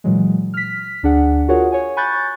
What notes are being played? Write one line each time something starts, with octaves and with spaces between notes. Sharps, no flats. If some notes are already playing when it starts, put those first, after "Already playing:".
A#2 E3 F#3 G#3
F6 B6
D2 D4 G#4 F#5
F4 F#4 G#4 A#4 C#5 F#5
C#5 G#5
G#5 B5 C#6 F#6 G6 A6